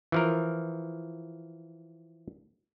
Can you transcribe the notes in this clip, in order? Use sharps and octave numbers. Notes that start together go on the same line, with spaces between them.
E3 F3 A#4